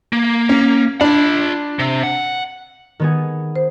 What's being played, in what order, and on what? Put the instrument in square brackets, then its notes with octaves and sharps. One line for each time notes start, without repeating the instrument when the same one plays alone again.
[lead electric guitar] A#3
[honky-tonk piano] C#4
[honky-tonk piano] D4 [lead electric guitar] F4 B5
[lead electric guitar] C3
F#5
[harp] D#3 B3 G#4
[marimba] C5